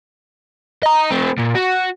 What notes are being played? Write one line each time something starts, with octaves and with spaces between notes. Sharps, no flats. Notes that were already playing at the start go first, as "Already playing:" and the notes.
D#5 A#5
A3 C4
A#2
F#4